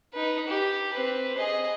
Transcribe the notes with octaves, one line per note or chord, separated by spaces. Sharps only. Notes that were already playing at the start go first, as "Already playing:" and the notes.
D#4 B4
G4
C4 B4
G#4 D#5